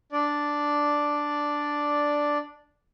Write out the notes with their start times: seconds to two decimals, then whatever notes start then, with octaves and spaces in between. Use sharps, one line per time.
0.12 D4 D5